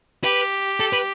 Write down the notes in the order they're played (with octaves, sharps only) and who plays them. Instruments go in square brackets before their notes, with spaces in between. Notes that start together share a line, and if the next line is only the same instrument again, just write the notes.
[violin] G4 [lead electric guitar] B4
[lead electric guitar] A4
B4